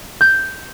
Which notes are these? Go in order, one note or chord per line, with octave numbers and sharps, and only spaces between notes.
G6